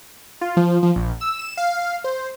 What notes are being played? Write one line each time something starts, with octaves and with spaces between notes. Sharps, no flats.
F4
F3
F3
A#1
E6
E7
F5
F5
C5